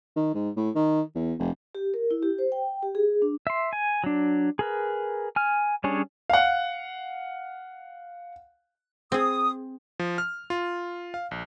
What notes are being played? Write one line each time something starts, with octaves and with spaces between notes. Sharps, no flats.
D#3
G#2
A2
D#3
E2
F1
G4
A#4
E4
G4
C5
G5
G4
G#4
D4
E5 C6
G#5
F#3 D4
G#4 A#4 B4
G#5 F6
G3 C#4 D4 G#4 C#5
F5 F#5
C4 G#4 D#6
F3
F6
F4
F5
A#1